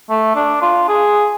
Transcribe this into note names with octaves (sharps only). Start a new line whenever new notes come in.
A3
D4
F4
G#4